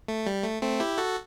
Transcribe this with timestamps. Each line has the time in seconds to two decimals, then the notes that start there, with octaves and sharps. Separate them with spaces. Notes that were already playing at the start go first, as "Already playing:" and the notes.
0.08 A3
0.26 G3
0.44 A3
0.62 A3 C4
0.80 E4 G4
0.98 F#4 A4